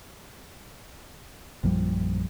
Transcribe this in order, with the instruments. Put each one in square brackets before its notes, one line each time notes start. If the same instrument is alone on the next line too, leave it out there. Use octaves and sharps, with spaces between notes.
[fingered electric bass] A#1 F#2 F3 G3